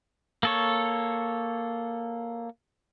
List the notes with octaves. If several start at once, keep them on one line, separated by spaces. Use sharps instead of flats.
A#3 A4 C#5